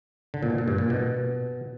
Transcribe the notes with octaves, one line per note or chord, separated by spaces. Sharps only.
D3
A#2
B2
A#2
G2
A#2
B2